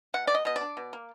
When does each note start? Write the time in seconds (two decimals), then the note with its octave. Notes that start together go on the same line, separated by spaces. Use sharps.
0.14 B2 F#5
0.27 B2 D5
0.35 D#5
0.45 B2 D#5
0.56 D5
0.61 D4
0.77 B2
0.93 A#3